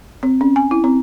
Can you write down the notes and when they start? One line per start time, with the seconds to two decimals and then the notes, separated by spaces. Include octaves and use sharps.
0.23 C4
0.41 C#4
0.56 G#5
0.71 E4
0.84 C4